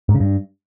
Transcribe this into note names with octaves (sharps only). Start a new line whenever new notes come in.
G#2
C#3
G2